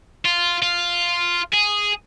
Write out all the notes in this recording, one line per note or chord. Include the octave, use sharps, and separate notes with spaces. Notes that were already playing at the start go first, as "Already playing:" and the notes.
F4
F4
G#4